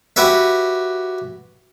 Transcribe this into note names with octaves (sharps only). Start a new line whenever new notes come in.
F#4 G4 B4 C#5 E5